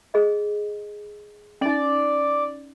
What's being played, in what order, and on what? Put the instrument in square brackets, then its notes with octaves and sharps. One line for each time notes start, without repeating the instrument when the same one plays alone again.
[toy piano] G#4 D#5
[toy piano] C#4 D#4 [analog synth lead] D5